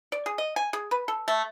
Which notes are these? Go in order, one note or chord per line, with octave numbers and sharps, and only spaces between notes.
D5
G#4
D#5
G#5
G#4
B4
A4
A3